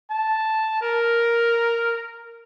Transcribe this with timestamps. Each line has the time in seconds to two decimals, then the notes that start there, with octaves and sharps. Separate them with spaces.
0.10 A5
0.82 A#4